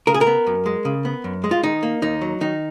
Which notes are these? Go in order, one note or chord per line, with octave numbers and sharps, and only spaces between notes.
C#3 A#4
G#4
A#4
B3
F#2
G#3
C#3
B3
F#2
G#3
F4
D#3 D#4
A#3
D#2 D#4
F#3
D#3 D#4